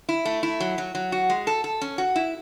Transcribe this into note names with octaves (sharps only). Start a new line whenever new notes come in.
E4
A3
E4
F#3
F#3
F#3
F#4
G#3
A4
A4
C#4
F#4
E4